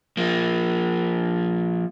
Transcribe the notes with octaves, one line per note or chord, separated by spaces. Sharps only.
F3 A#3